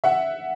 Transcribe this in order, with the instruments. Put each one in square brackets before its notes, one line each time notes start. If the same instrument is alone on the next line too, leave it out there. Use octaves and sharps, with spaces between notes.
[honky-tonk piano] E5 F#5